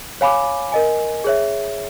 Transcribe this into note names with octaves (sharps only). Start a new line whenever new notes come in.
C#5 F5 G#5 B5 D6
A#4 D#5 G#5
G#4 C#5 E5